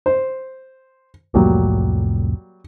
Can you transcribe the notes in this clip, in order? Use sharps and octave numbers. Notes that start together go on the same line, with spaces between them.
C5
C2 F2 A2 F#3 G3 A#3